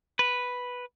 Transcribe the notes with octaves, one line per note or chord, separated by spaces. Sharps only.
B4